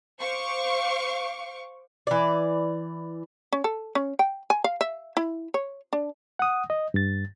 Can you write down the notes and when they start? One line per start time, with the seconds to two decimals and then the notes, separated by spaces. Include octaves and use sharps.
0.20 C5 F5 C#6 D6
2.07 E3 D5
3.52 C#4
3.64 A4
3.95 C#4
4.19 G5
4.50 G#5
4.64 F5
4.81 E5
5.17 E4
5.54 C#5
5.93 D4
6.39 F#5 D#6
6.70 D#5
6.94 G2 A6